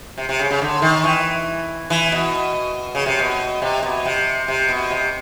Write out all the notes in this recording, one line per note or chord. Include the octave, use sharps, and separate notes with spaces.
C3
C3
C#3
C#3
D3
D#3
E3
E3
B2
C#3
C3
B2
C3
B2
C3
C3
B2
C3